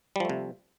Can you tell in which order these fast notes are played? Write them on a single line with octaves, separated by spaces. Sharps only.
G3 F3 A3 C3